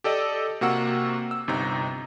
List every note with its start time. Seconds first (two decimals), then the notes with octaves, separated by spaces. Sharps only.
0.04 G4 A4 D5 D#5
0.61 C3 A#3 F#4 F#5 E6
1.31 E6
1.48 G1 C3 D#4 A#5